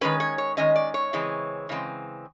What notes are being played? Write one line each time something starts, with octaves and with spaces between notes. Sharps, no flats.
D#3 G#3 C#4 B4
C#5
C#5
D#3 G#3 C#4 D#5
D5
C#5
C#3 E3 G#3 C4
C#3 E3 G#3 C4